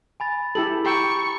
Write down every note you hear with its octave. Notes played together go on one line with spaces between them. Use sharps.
G#5 B5 A6
E4 G4 A4 F#7
G4 G5 A#5 B5 C#6 E6